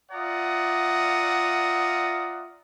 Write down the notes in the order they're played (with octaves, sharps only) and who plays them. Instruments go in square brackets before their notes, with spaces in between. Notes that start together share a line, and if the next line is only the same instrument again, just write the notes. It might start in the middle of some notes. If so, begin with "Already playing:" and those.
[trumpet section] F4 D5 E5 F#5 A#5 D#6